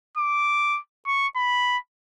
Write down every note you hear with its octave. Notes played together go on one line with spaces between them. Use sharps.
D6
C#6
B5